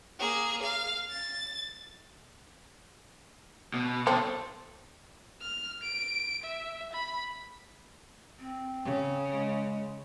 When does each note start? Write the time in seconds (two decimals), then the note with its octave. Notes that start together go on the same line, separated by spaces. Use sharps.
0.20 A#3 G#4
0.63 F5
1.10 A6
3.74 B2
4.07 B2 C4 A4
5.41 F6
5.83 D7
6.43 E5
6.93 B5
8.40 C4
8.85 C#3
9.31 G#3